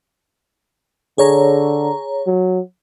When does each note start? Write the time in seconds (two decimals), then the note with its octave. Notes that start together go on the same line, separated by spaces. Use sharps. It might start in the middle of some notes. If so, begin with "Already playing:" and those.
1.18 D3 G#4 C#5 A#5
2.27 F#3